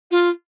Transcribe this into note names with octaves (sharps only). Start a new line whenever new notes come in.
F4